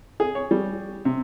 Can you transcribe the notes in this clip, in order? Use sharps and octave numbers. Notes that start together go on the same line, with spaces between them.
G#4
C#5
G3
C3